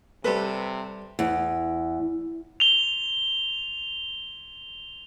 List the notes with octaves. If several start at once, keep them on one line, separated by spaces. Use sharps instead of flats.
C3 G3 A4 B4 C5
E2
F7 G7